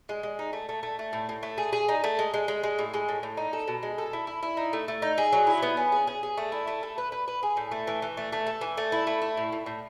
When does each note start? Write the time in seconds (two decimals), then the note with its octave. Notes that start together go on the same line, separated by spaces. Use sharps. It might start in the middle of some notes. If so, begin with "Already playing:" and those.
0.09 G#3
0.23 G#3
0.39 D#4
0.53 A3
0.69 A3
0.83 A3
0.99 A3
1.13 A2
1.29 A2
1.43 A3
1.58 G#4
1.73 G#4
1.89 D#4
2.04 A3
2.19 G#3
2.34 G#3
2.48 G#3
2.63 G#3
2.79 A2
2.94 G#3
3.09 A2
3.23 A2
3.37 D#4
3.53 A4
3.68 B2
3.83 G#3
3.98 A4
4.13 E4
4.27 E4
4.43 E4
4.57 D#4
4.73 A3
4.88 A3
5.02 D#4
5.18 G#4
5.33 F#3
5.47 E4
5.63 B3
5.77 C#4
5.92 G#4
6.07 G#4
6.23 G#4
6.37 A3
6.52 E4
6.68 A3
6.83 A4
6.98 B4
7.12 B4
7.28 B4
7.43 G#4
7.57 A2
7.72 A3
7.87 E3
8.02 E3
8.17 A3
8.33 A3
8.47 A4
8.61 E3
8.78 A3
8.92 E4
9.07 A3
9.22 E4
9.37 A2
9.52 A2
9.66 A2